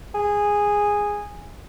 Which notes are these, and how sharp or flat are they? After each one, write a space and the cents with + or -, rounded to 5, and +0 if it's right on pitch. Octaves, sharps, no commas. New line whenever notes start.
G#4 -10